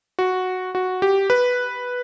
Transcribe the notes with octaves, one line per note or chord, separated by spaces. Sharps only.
F#4
F#4
G4
B4